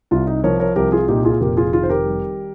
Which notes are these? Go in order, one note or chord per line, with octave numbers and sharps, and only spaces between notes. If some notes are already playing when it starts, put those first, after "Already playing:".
C2 F4
D#4
F3 A#4 C#5
A#4 C#5
C2 G4 A#4
F4 G#4
A#2 D#4 G4
F4 G#4
F1 G4 A#4
F4 G#4
D#3 F4 G#4
C5
G4 A#4
G3